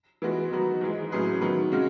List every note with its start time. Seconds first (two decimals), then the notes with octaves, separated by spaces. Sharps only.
0.22 E3 G#3 B3 F#4
0.52 D#3 F#3 B3 D#4 F#4
0.81 G#2 E3 G#3
1.11 A2 F#3 C#4 G#4 B4
1.41 D#3 F#3 B3
1.72 C#3 G#3 C#4 F#4